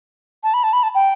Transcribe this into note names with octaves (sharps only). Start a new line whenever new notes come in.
A5
B5
A5
B5
A5
G5